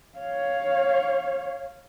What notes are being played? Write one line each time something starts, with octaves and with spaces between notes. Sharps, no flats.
C#5 F5